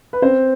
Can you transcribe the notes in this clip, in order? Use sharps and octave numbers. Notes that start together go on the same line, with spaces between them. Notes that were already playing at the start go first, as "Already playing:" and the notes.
B4
C4 C5